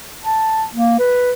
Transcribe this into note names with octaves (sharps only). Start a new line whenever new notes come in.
A5
A#3
B4